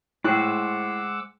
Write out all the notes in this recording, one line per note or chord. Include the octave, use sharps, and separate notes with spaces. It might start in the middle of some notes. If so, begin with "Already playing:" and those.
A2 G#3 C5 F#5 G5 D6 E6 F#6